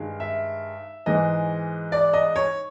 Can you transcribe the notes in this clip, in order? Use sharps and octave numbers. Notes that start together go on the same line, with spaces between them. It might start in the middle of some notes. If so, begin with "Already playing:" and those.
Already playing: G2 D#3 G#3
E5
G#2 E3 G#3 D#5
D5
D#5
C#5